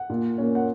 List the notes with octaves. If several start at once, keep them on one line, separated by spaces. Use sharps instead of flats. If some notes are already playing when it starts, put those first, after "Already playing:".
Already playing: F#5
A#2
A#3 C#4
F#5